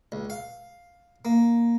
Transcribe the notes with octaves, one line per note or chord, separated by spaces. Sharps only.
C#2
F5
A#3